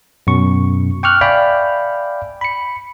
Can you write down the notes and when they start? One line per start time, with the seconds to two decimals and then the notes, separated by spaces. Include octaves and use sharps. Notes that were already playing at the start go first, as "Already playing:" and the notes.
0.27 F#2 B2 C#6
1.03 G5 C#6 D6 F6 F#6
1.21 D5 E5 F5 G5 G#5 B5
2.41 B5 C#7